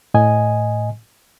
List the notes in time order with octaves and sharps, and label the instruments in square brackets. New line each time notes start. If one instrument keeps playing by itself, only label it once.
[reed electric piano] A2 D#5 G#5